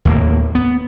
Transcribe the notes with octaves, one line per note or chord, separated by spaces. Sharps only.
D#2 A2 G3 A#3
B3